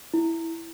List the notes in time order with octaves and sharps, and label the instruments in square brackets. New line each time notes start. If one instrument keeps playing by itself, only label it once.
[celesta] E4